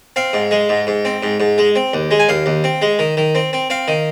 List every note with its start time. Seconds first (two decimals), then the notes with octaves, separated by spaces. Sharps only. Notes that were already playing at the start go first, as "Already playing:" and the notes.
0.16 C4 F5
0.33 G#2
0.51 G#3
0.69 G#2
0.87 G#2
1.05 C4
1.23 G#2
1.40 G#2
1.58 G#3
1.76 C4
1.94 D#2
2.11 G#3
2.19 G#5
2.29 D#2 F5
2.46 D#2
2.64 C4
2.82 G#3
2.99 D#3
3.17 D#3
3.35 C4
3.53 C4
3.70 C4 F5
3.88 D#3